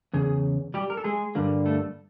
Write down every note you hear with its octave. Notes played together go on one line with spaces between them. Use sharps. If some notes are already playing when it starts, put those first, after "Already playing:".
E2 C#3 G#4
G3 G4
A#4
A4
G#3 G#4
G2 D3 G3 A#3
A3 A4